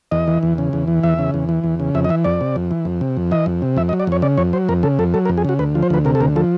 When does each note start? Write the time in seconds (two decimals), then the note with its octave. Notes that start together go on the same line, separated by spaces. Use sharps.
0.11 E2 D#5
0.27 E3
0.43 E2
0.58 C#3
0.73 E2
0.88 E3
1.03 E2 E5
1.19 C#3
1.34 E2
1.49 E3
1.64 E2
1.80 C#3
1.94 F2 E5
2.04 D#5
2.09 E3 E5
2.24 F2 D5
2.41 C3
2.56 F2
2.71 E3
2.85 F2
3.01 C3
3.17 F2
3.31 E3 D#5
3.46 F2
3.62 C3
3.77 F2 E5
3.89 D#5
3.93 F#3
4.00 D5
4.07 F2 C#5
4.22 C#3 D5
4.38 F2 C#5
4.53 F#3 C5
4.69 F2 A#4
4.83 C#3 A4
4.99 F2 A4
5.14 F#3 A4
5.25 A#4
5.29 F2
5.37 G#4
5.45 C#3 F#4
5.59 D2 B4
5.75 F3
5.83 C5
5.90 D2 B4
6.05 C3 A#4
6.15 A4
6.20 D2 A#4
6.36 F3 A4